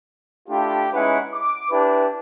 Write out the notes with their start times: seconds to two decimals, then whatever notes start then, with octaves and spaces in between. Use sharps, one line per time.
0.49 A3 D4 E4 F4 G4
0.93 G#3 C#4 D#4 E4 B4 F#5
1.33 D6
1.70 D4 E4 G4 B4